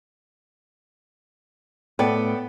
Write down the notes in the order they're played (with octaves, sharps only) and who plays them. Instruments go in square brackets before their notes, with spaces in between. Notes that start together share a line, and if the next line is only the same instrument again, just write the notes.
[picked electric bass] A2 [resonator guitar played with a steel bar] B3 [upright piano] A4 D5 G5